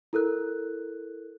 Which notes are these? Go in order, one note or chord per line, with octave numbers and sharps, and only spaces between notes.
E4 A4 A#4 F#6